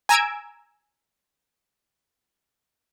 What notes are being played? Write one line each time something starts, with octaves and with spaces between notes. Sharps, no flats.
G#5 A#5 E6 G#6 D7